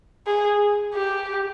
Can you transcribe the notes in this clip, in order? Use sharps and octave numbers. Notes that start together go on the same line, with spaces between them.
G#4
G4